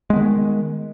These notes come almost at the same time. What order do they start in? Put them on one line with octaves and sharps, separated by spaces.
G#3 B3 D#3